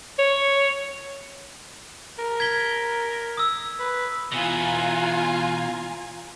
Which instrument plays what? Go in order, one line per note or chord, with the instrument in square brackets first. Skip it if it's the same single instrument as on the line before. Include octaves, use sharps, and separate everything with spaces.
[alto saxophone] C#5
[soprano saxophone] A#4
[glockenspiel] G#6 B6 G7
D#6 E6
[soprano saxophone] B4
[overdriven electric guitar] B2 E3 [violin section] F4 G#5 A#5